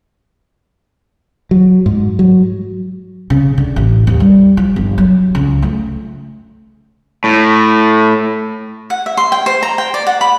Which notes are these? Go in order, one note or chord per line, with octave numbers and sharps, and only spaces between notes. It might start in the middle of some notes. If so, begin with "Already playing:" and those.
F#3
G#2
F#3
C#3
D3
A1
D#2
G3
F3
G1
F#3
C#2
A3
A2
F#5
E5
C6
G5
C5
A#5
G5
D5
F#5
B5